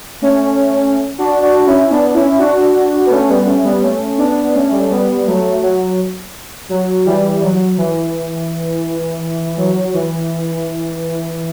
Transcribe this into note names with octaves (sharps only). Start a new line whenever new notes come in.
A3 C#4
D4 F#4
D4 F#4
C#4 E4
B3 D4
C#4 E4
D4 F#4
B3
A3 C#4
G3 B3
A3 C#4
G3 B3
A3 C#4
B3 D4
B3
A3 C#4
G3
A3
G3 B3
F#3 A3
F#3
F#3
E3 G3
F#3
E3
F#3
E3